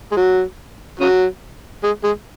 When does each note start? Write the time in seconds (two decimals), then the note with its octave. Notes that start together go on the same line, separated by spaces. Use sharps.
0.11 G#3
0.17 F#3
1.00 C#3 F#3
1.83 G#3
2.04 G#3